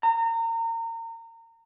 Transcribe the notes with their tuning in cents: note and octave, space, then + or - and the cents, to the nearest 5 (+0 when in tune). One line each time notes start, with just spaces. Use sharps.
A#5 -30